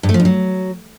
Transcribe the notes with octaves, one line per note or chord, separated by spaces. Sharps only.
G2
A3
F3
G2
F#3